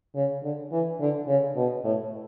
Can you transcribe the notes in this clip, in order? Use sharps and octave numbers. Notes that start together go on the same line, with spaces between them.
C#3
D3
E3
D3
C#3
B2
A2